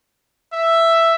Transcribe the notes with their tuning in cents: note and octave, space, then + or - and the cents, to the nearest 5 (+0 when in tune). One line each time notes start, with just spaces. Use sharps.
E5 +5